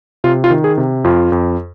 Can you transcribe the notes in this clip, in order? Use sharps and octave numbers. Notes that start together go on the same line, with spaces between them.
C3 F4
F4
D#3
G#4
C3
F2 F4
F2